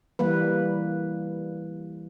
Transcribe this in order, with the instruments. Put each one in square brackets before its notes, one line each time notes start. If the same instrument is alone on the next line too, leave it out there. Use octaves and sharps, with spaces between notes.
[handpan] E3 G3 A#3 B4